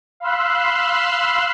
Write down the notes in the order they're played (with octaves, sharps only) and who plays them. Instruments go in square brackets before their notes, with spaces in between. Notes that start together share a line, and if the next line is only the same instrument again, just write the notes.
[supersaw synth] F5 B5 C6 E6 F#6